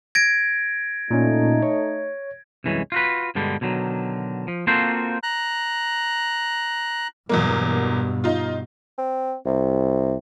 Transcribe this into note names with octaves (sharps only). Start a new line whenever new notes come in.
G#6 A#6 D7
A#2 A3 C#4 D#4
C#5
C2 F#2 E3 G#3 C#4
F4 F#4 B4
G2 B2 D3 G3 G#3
B2 D3 D#3 F#3
F3
A#3 C4 F4 F#4 A4 C5
A#5 F#6
E2 G2 B2 F#3 A#3
D#4 F4
C4
C2 C3